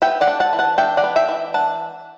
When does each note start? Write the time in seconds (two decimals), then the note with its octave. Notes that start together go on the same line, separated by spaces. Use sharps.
0.02 B3 E5 G5
0.21 D5 F#5
0.27 D4
0.40 F#5 A5
0.53 E3
0.59 F#5 A5
0.78 D4 E5 G5
0.97 D5 F#5
1.04 B3
1.16 E5 G5
1.29 E3
1.54 D4 F#5 A5